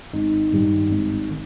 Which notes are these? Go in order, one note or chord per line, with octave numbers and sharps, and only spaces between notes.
G#1 D#4
G2 D#3 G3
G#1
D#3